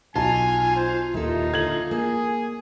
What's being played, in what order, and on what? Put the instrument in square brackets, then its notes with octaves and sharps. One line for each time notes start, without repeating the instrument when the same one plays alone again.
[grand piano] B1 A5 [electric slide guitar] F4 [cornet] G#5
[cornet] C5
[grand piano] D#1 [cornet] D#4 [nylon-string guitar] E4 A4
[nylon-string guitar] D3 [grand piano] G#6 F#7
[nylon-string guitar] A#3 [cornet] G#4